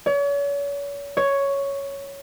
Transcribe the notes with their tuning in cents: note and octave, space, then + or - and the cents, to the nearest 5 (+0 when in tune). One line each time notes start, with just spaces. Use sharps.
C#5 +40
C#5 +5